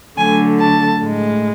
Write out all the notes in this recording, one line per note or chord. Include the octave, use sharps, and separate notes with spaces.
D3 F#3 A3 G#5
A5
A2 G#3